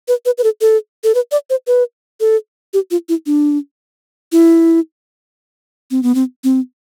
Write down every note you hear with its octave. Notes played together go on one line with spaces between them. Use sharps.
B4
B4
B4
A4
A4
A4
B4
D5
C5
B4
A4
G4
F4
E4
D4
E4
C4
B3
C4
C4